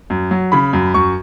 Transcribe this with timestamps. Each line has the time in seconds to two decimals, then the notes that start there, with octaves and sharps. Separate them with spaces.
0.10 F#2
0.31 F#3
0.52 C#3 B5
0.73 F#2
0.94 F#2 C#6